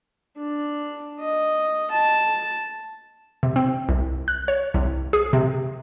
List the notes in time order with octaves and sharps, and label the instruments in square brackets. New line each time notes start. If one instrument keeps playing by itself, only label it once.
[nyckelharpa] D4
D#5
A5
[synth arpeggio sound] C3
C4
C2
F#6
C#5
C2
G#4
C3